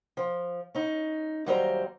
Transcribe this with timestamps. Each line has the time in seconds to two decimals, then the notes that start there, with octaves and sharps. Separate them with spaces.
0.17 F3
0.75 C#4 D#4
1.46 D#2 F#3 G3 C5 C#5 A#5